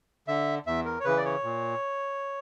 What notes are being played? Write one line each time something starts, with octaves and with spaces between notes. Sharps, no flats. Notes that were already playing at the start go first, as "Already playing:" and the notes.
D3 E5
E2 E5
A#4
C#5
C#3 E3 B4
D5
C#5
A#2